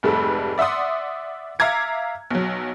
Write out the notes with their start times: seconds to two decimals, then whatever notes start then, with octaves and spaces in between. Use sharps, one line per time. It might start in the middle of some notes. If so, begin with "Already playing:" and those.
0.03 F1 G#2 G3 A3 B4 E6
0.58 D5 E5 F#5 C6 D#6
1.59 E5 F5 A#5 D6 G#6 C#7
2.30 B1 F#3